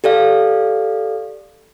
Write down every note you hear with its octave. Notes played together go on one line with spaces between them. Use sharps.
G4 A4 D5 F5